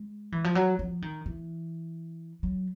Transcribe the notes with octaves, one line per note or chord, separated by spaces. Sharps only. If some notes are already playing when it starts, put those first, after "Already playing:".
Already playing: G#3
E3
F3
F#3
F3
D#3
E3
F#3